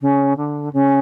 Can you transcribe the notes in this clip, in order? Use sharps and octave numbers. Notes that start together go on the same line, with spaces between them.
C#3
D3
C#3